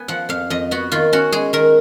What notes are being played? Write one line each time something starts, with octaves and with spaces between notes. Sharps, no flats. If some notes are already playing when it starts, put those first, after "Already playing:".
Already playing: B3 G#5
F3 F#5
F2 F5
F2 D#5
B3 F#4
D#3 F4
C#4 F#4
G#3 G#4
D#3 A#4